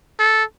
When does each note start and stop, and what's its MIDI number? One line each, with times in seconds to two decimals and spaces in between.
0.19 0.44 69